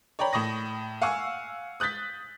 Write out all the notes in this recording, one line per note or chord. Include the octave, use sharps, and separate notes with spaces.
C#5 D5 G5 A#5 B5
A2 B5 C#6 D#6 A#6
F5 F#5 G#5 C#6 E6
D#6 F#6 G6 A6 B6